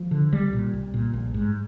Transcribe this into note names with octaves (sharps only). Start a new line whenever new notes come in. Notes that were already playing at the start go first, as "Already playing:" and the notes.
Already playing: F3
D3
C2 G3
A#2
C2
A#2
A#1
G#2